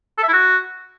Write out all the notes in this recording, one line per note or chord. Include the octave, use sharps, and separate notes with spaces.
A4
E5
E4
F#4